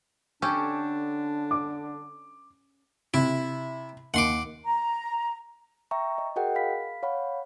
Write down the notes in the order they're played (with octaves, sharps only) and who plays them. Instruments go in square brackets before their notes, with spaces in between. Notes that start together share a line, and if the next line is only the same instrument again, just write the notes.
[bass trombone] D3 [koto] C#4 G4 A4 [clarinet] D4
[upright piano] D6
[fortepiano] C3 [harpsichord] E4
[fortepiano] D#2 [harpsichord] F#5 C6 D6
[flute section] A#5
[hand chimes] E5 G5 A#5 C#6
D#5
F#4 G#4 A#4 D#5 F#5 G5
F5 B5 B6
C#5 F5 F#5 B5